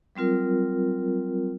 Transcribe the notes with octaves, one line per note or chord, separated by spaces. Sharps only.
F#3 G3 C4 F4 A#4